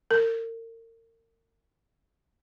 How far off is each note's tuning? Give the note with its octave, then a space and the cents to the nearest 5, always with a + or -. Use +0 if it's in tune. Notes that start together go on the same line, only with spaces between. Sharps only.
A#4 -35